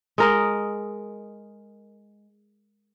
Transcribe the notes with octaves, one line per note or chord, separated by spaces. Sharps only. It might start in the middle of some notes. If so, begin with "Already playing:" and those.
G#3 A#4 D#5